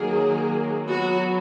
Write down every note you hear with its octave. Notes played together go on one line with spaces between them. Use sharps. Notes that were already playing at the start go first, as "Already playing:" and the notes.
Already playing: D#3 F#3 A#3 G#4
F#3 B3 F#4